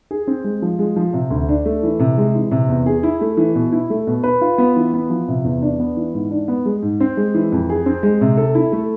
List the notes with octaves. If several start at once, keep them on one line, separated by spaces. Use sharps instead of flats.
G#4
C4
G#3
F3
G#3
F3
C3
D2
D4
A3
E3
C3
G#3
E3
C3
E2
G#4
E4
A3
E3
B2
E4
A3
B2
B4
F4
B3
E3
B3
F3
C3
E2
D4
B3
E3
G#2
D4
B3
G#3
G#2
C4
G#3
E3
F2
G#4
C4
G#3
C3
A4
E4
A3